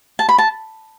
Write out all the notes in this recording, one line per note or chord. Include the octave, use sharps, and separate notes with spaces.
A5
B5
A5